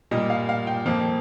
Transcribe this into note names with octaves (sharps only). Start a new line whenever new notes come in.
A#2 G3 A#3 D#5
F5
F5
G5
F2 F3 A#3